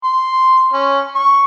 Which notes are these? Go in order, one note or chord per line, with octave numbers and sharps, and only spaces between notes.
C6
C#4
C#6